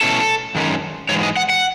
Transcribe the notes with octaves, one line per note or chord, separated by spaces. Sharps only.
B2 A3 C#4 E4 A4
F#2 D#3 G#3 C#4
G#2 E3 G#3 C#5
D#5
F#5
F#5